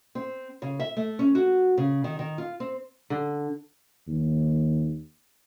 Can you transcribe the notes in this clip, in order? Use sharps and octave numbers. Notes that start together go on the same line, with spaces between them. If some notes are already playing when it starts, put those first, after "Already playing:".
C4
C#3
E5
A3
C#4
F#4
C#3
D#3
D#3
F4
C4
D3
D#2